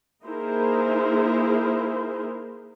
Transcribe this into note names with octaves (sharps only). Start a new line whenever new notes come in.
A#3 D#4 E4 G#4 A#4 C5